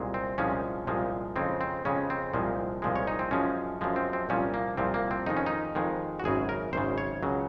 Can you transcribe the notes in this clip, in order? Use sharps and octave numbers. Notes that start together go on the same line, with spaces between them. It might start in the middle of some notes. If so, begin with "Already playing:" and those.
Already playing: C2 A#2 G#3
C4
C2 A#2 F3 G#3 C#4
C2 A#2 F3 G#3
F2 C#3 G#3 C4
C4
F2 C#3 G#3 C#4
C4
C2 A#2 F3 G#3
C2 A#2 F3 G#3
C#5
D#4
C4
F#2 F3 G#3 C#4
F#2 F3 G#3
C4
C4
C2 A#2 F3 C#4
A#3
C2 A#2 F3 C4
A#3
C4
F2 D#3 G#3 D#4
C#4
D#4
F2 D#3 G#3
F#4
G#1 F#2 C#3 G#4
A#4
G#1 F#2 C#3 C5
C#5
C#2 C#3 F#3